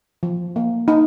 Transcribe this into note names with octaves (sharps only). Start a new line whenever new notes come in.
F3
A#3
A#3 D#4